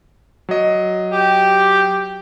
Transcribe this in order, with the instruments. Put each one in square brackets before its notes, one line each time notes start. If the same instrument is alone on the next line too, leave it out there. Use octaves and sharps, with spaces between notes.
[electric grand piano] F#3 D#5
[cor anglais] G4